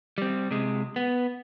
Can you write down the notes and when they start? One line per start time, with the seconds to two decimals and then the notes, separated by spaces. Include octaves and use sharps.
0.18 G3 C4
0.51 C3 G#3
0.96 B3